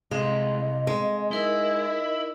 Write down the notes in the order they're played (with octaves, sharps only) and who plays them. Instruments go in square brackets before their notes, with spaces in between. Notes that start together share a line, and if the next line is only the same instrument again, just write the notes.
[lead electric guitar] C2 [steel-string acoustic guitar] G#3 [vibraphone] C4 F5 [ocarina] D#5
[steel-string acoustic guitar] G#3
[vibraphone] D#4 A#4 E6 [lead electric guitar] E4 [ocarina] D#5